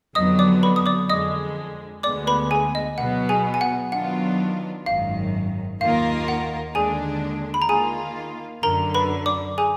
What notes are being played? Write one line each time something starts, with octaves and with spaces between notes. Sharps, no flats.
F2 D3 F#3 B3 D#5 D#6
D5 D6
B4 B5
D#6
D5 D6
F2 D3 G#3 D#5 D#6
D2 D3 G#3 B3 D5 D6
B4 B5
G#4 G#5
D#5
B2 F#3 B3 F#5
G#4 G#5
G#5
F#5
D#3 F#3 B3 D4 F4 F#5
G#1 F#2 D#3 F#3 F5
D#2 D#3 A#3 F4 A#4 F5
F#5
D#2 D3 G#3 D4 G#4 G#5
B5
A#5
D#3 A#3 F4 G#4 G#5
F#2 D3 F#3 A#4 A#5
B4 B5
D5 D6
G#4 G#5